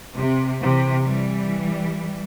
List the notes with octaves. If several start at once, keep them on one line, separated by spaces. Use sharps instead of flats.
C3
C3 E3
E3 G3